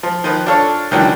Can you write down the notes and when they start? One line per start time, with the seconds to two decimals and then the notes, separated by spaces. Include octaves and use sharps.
0.03 F3
0.24 D#3 F3 B4
0.46 D4 F4 A4 C#5
0.91 C#2 D#3 E3 F#3 D4 G5